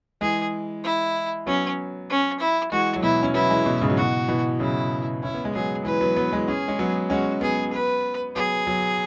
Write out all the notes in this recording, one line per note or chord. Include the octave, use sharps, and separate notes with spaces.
E3 G#3 G#4
E4
F#3 B3 C#4
C#4
E4
E3 G#3 F#4
F#3
B2 E3 E4
C#4
F#3 B3 E4
E3 G#3
B2
G#2 C#3
F#3
B2 E3 F#4
B2 E3
C#3 F#3 E4
C#4 E4
B3
G#3
F#3 B3 G#4
E3 G#3 B4
F#3 B3
F#3 B3
E3 G#3
C#4 G#4
G#3 C#4
F#3 B3
G#3 C#4 F#4
F#3 B3 G#4
B4
F#3 B3 G#4
F#3 B3